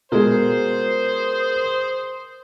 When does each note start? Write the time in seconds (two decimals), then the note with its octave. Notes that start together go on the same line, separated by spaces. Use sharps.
0.12 B2 G#3 G#4 A#4 C5